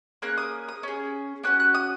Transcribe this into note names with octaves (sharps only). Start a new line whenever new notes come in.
A#3 C#4 G#4 F#6
D#6
D#6
C#4 G#4
A#3 C#4 F#4 F#6
F#6
D#6